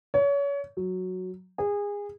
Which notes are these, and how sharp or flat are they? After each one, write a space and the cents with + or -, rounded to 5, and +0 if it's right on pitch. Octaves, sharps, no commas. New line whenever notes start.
C#5 +30
F#3 -5
G#4 -25